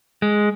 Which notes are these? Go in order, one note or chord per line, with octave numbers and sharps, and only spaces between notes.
G#3